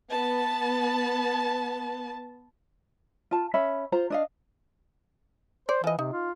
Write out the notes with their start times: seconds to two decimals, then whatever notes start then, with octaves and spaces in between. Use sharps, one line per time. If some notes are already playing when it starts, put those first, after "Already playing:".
0.11 B3 A5
3.31 F4 A5
3.54 C#4 E5 B5
3.92 F4 C5 A#5
4.10 D4 D#5 F5
5.69 C5 D5
5.84 E3 F3 D#5
5.99 C3 D#4
6.13 F4